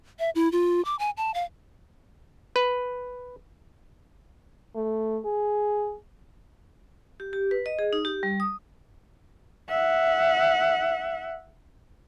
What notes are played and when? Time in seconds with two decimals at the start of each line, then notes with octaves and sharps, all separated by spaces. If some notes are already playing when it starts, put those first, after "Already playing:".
0.19 E5
0.35 E4
0.52 F4
0.85 D6
0.99 G#5
1.17 A5
1.34 F5
2.56 B4
4.75 A3
5.25 G#4
7.20 G4
7.33 G4
7.51 B4
7.66 D#5
7.79 G#4
7.93 D#4
8.05 G4
8.23 G3
8.40 D#6
9.69 E5 F#5